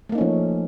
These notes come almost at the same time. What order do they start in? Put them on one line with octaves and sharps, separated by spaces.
A3 A#3 D#4 C#4 F3